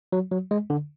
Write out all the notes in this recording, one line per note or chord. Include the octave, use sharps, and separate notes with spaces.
F#3
F#3
G#3
D3